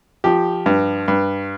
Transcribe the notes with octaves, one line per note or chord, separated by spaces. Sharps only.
F3 G4
G2
G2